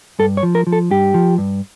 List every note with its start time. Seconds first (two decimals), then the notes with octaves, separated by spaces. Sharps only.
0.19 G2 A4
0.37 C#5
0.43 F3
0.55 A#4
0.67 F3
0.72 A4
0.91 G2 G4
1.14 F3
1.38 G2